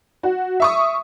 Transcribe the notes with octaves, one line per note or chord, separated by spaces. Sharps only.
F#4
E5 C#6 D#6